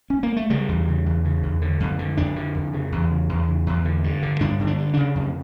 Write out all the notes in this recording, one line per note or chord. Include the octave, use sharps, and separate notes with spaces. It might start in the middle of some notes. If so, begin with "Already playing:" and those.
C#4
A#3
A3
C#3 G3
E2
C#3
E2
C#3
E2
D3
F2
D3
F2 D4
D3
F2
C#3
E2
C#3
E2
C#3
E2
D3
G2
D3
G2 D4
D3
D4
G2
C#3 D4
F2